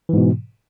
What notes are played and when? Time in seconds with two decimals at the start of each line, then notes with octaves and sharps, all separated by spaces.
0.09 E3
0.13 G#2
0.17 B2